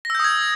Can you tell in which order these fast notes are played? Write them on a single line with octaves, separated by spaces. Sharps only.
A#6 E6 G6 D#6 G#6